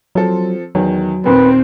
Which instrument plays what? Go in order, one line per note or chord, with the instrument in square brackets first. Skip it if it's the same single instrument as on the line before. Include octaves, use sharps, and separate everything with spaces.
[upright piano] F3 C4 A4 [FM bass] F#3
[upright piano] E2 D#3 [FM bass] F#3
[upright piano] D#2 A#2 [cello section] C4 [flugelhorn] B4